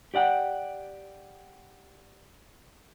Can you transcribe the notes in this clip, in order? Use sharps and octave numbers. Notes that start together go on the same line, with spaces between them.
G4 D5 F#5 G5